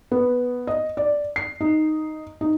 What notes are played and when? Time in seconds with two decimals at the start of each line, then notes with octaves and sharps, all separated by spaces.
0.12 B3
0.67 D#5
0.97 D5
1.36 C7
1.61 D#4
2.41 D#4